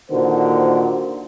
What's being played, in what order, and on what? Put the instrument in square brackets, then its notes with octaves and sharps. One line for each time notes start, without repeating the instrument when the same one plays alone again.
[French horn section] A#2 D3 D#3 F#4 C5